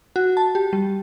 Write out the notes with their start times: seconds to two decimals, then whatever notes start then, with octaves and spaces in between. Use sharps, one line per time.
0.16 F#4
0.37 A5
0.55 G4
0.73 G3